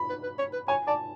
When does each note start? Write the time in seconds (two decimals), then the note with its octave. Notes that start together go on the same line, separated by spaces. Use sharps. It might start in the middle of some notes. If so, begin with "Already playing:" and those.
Already playing: B5
0.09 B4
0.23 B4
0.38 C#5
0.53 B4
0.68 C#5 G#5
0.87 D5 A5